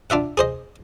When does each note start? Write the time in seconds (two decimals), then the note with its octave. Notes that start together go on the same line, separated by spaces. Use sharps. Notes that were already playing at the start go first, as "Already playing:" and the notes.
0.10 D4 F4 E5 F#5
0.37 G#4 C5 D#5